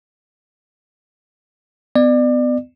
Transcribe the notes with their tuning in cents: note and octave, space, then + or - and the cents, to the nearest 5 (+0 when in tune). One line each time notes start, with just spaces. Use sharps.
B3 +30 D5 +30